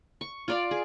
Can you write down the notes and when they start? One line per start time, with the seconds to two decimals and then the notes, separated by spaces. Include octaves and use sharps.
0.21 C#6
0.48 F4 D5 F5
0.71 G#4